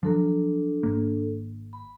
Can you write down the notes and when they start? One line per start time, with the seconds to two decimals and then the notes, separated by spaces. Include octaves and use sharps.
0.03 F3 F#3 D4 A4
0.83 G#1 A#3
1.73 B5